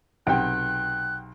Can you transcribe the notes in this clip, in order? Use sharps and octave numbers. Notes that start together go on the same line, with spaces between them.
B1 C3 F#5 G5 F#6